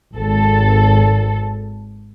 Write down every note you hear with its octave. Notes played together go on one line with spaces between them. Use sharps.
G#1 A4